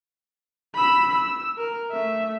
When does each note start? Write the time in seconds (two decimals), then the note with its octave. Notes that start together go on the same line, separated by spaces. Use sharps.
0.75 B5 E6
1.15 E6
1.58 A#4
1.91 A3 E5